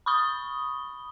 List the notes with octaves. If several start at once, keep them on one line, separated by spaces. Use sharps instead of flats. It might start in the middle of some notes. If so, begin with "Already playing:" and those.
B5 C#6 D#6 G7